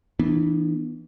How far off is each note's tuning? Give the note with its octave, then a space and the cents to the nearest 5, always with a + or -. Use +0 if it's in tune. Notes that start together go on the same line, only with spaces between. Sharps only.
E3 -10 B3 -10 D4 +35